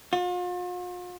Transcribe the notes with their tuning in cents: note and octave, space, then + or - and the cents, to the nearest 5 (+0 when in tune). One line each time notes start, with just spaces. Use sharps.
F4 +40